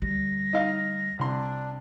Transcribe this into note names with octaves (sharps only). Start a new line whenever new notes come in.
D2 G3 A#6
D#4 D#5 F5
C2 D4 C6